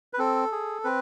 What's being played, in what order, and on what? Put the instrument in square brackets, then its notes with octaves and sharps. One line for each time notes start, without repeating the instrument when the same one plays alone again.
[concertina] B4
C4 A4
G#4
C4 B4